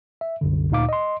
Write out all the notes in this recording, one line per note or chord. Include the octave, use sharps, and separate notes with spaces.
E5
C2 F#2 D3
D2 A#2 D#4 F5 D6
D#5 C6